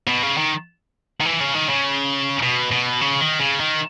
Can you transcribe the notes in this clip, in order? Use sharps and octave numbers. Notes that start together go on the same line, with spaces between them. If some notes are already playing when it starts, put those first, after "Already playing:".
B2
C#3
D#3
D#3
E3
C#3
D#3
C#3
B2
B2
C#3
D#3
C#3
D#3